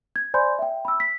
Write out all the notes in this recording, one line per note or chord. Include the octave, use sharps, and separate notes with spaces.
G#6
C5 D5 G#5 B5 C6 G6
E5 G5
B5 E6
B6